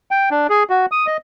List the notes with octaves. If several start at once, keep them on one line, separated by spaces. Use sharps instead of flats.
G5
D4
G#4
F#4
D#6
D#5